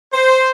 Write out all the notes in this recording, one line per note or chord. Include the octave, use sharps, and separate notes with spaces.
C5